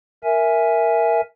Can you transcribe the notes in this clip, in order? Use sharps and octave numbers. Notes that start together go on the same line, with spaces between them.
A#4 E5 G#5